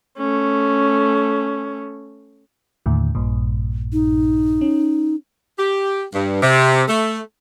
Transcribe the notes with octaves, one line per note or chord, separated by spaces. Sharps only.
A3 C#4
D#2 A2 D3
A#1 G2 A#2
D#4
C#4
G4
G2
C3
A3